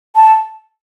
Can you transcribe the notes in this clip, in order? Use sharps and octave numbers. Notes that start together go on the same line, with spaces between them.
A5